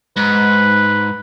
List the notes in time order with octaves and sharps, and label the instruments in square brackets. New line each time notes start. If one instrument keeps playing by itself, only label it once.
[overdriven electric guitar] G#2 [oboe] B4